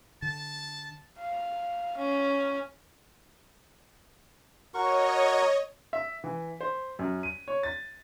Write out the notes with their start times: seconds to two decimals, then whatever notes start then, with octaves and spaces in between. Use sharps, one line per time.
0.22 D3 A5
1.20 F5
1.98 C#4
4.74 F#4 A#4 C#5 D#5 C#6
5.93 E5
6.24 E3
6.61 C5
6.99 F#2
7.23 D#7
7.48 C#5
7.63 A6